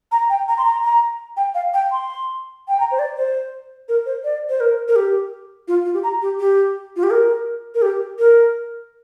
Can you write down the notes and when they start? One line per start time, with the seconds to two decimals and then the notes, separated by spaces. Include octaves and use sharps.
0.12 A#5
0.30 G5
0.48 A#5
0.58 C6
0.65 A#5
0.84 A#5
1.37 G5
1.55 F5
1.74 G5
1.92 C6
2.68 G5
2.80 A#5
2.91 C5
2.99 D5
3.17 C5
3.89 A#4
4.06 C5
4.24 D5
4.49 C5
4.60 A#4
4.88 A#4
4.96 G4
5.68 F4
5.85 F4
5.94 G4
6.03 A#5
6.22 G4
6.40 G4
6.96 F4
7.03 G4
7.11 A#4
7.75 A#4
7.82 G4
8.19 A#4